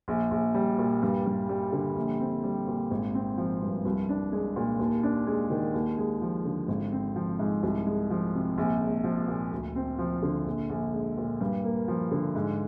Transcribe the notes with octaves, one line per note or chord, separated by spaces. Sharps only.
A#1
A#1
G3
A#2
G2
G2
G3
D3
A#1
C4
G3
A#2
G#1
C4
F3
G2
C2
D4
G#3
A#2
D#2
D4
G#3
D#3
D#2
G#3
F3
D3
G#1
C4
F3
G#2
C2
G#3
F3
C3
A#1
G#3
F3
A#2
D2
C4
F3
D3
A#1
A#1
G#3
A#2
G2
A#3
F3
D3
G#2